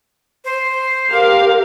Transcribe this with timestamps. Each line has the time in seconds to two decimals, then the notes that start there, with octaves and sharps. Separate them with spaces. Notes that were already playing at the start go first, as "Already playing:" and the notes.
0.45 C5
1.11 G4 A#4 F5